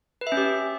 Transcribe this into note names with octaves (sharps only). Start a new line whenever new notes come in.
B4
E5
C#4
G4